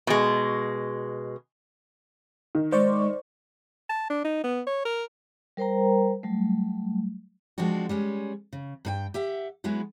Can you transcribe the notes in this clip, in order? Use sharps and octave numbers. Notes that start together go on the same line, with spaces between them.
B2 G#3
D#3
G#3 C5 D5 C#6
A5
D4
D#4
B3
C#5
A#4
G3 A#4 C5 G5 A#5
F#3 G3 A3
F3 G#3 C4 D4 F#4
G3 G#3 C#4
C#3
G2 A4 G5
G4 E5 F#5
F#3 G#3 B3 E4 F#4